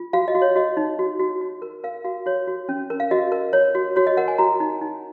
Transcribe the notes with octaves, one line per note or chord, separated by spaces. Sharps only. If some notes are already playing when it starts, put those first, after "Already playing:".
Already playing: F4
F#4 F5
D#5
F#4
C#5
F#4 D#5
D#4
F#4
F#4
F#4
A#4
A#4 F5
F#4 F5
F#4 C#5
F#4
C#4
A#4
F5
F#4 D#5
A#4
C#5
F#4
F#4 C#5
D#5
A#4 F#5
G#5
F#4 A#5
D#4
D#4